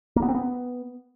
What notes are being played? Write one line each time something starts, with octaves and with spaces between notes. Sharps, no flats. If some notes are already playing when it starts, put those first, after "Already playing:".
A#3
B3
C4
B3